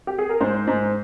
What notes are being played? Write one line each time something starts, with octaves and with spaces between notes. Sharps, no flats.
G4
G#4
A#4
G#2 C5
G#2